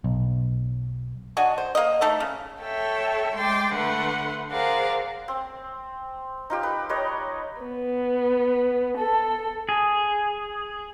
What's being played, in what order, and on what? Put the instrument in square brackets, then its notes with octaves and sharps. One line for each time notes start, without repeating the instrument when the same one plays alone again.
[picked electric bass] B1
[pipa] D4 F#4 D#5 G#5
C5
A#3 D#5
E3 A3 D#4 A4
C#3
[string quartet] A4 C#5 E5 G5
G#3 G5 C6 D6 A6
D3 A3 B4 F#5 C6
G#4 A#4 C5 D5 F5 F#5
[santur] C4
D#4 F4 G4
B4
G3 B4 C#5 D#5
[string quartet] B3
A4
[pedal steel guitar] G#4